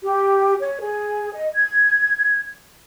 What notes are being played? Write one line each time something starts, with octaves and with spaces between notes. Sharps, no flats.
G4
C#5
G#4
D#5
G#6